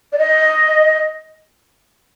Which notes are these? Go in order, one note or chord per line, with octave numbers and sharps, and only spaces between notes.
D5
D#5